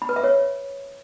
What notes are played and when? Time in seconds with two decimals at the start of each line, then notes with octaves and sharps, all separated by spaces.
0.02 B5
0.09 B4
0.16 E5
0.24 C#5